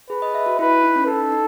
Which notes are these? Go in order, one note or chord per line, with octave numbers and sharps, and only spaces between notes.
G#4 B4
D#5
E5
F#4
E4 B4
D#4
C#4
D#4 A4
D#4